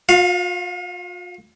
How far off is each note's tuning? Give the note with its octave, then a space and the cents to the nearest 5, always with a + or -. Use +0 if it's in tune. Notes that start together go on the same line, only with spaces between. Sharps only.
F4 +45 F5 +0